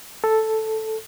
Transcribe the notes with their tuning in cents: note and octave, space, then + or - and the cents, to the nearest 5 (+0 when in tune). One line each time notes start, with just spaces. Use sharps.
A4 +0